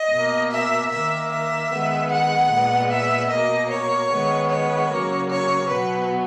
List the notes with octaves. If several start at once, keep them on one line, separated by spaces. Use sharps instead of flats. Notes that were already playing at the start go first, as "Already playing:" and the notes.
Already playing: D#5
B2 A#3
E5
D#3 A#3 E5
E5
D#3 G#3 B3
F#5
A#2 G#3 B3
E5
B2 A#3 D#5
C#5
D#3 G#3 B3
C#5
C#3 F#3 A#3
C#5
B2 F#3 B3 B4